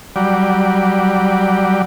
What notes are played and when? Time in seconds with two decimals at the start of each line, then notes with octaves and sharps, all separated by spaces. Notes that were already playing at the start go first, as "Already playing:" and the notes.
0.16 F#3 G3 D5